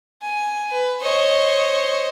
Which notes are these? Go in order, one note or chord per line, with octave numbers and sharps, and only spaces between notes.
G#5
B4
C5 C#5 D#5 C#6